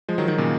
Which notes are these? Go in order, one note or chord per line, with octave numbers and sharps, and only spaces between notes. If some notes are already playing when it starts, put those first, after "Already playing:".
F3 G#3
D#3 F#3
D#3 F#3
A#2 C#3